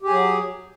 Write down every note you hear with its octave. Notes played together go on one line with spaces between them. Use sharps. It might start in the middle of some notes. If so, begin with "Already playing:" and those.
F#3 G4 G#4